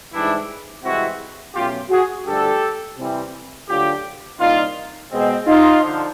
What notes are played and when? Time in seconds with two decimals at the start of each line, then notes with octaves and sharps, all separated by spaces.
0.12 G#2 E3 G3 D4 E4
0.83 C2 C3 E3 G#3 C4 E4 F#4
1.54 B2 F#3 A3 C#4 F4 G4
1.90 F#4 G#4
2.26 G2 D3 F3 A3 D4 G4 A4
2.98 C3 E3 G3 C4
3.68 D2 D3 F#3 F4 G4
4.39 C2 A#2 G3 D#4 F4
5.11 B2 G#3 C4
5.46 D#4 F4
5.81 D3 F3